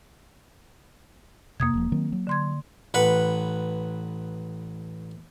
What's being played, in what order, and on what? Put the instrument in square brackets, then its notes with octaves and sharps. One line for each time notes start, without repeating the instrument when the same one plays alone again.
[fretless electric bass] F2 C3 [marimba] A#3 D#6 G#6
[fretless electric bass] E1 F3
D#3 F#3 C4
F#3
[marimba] D3 C6 G#6
[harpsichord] A1 B4 F#5